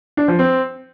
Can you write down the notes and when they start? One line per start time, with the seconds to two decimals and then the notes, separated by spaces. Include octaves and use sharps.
0.17 D4
0.28 F3
0.39 C4